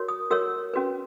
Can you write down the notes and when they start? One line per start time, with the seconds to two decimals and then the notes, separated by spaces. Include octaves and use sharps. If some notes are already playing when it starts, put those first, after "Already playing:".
Already playing: F#4 A#4 C#5
0.08 D#6
0.31 F#4 A#4 C#5 E6
0.74 C#4 F#4 B4